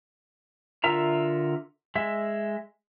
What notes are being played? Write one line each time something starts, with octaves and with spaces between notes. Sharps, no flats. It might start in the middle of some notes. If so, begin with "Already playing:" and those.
D3 F4 A#4 E5 A#5
G#3 E5